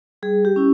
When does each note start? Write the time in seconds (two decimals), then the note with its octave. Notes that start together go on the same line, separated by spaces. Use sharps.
0.22 G3 G#4
0.45 G4
0.56 C#4 E4